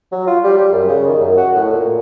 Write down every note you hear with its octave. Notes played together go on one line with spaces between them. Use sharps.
F#3
F4
G3
G3
F#2
C#3
D#3
F#2
F#4
A2
A#2